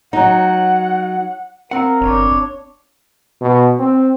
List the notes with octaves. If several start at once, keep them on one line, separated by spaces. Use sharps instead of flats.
F#3 D#4 F#5
C4 F4 A#4 F#5
G1 D4 C#5
B2
C4